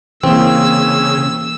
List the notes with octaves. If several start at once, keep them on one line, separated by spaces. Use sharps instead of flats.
C#3 E3 A#3 C4 E6